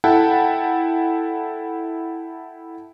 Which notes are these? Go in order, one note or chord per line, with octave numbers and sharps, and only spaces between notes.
E4 A4 F#5 G5 A5